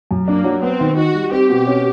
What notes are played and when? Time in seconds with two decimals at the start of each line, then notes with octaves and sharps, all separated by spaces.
0.11 F#2
0.27 A#3 D4
0.44 F#3
0.62 B3 C4
0.80 D#3
0.97 D#4 F#4
1.14 G3
1.31 C4 G4
1.50 B2
1.67 C#4